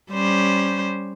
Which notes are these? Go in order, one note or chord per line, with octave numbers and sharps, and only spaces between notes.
G3 C#4 C5